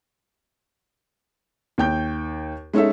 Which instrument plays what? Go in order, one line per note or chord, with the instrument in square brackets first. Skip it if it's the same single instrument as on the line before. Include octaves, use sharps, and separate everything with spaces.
[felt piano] D#2 G5 G6
G#3 C#4 D#4 A4 E5